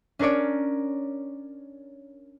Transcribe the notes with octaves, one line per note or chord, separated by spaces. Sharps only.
C#4 D4 A#4 C#5 D5